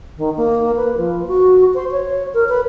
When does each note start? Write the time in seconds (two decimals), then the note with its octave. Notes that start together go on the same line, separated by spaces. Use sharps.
0.17 D#3
0.36 A#3
0.76 B4
0.97 F3
1.27 F#4
1.74 C5
1.91 C#5
2.33 A#4
2.48 B4